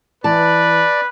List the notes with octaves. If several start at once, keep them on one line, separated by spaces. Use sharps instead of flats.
E3 B4 D5 A5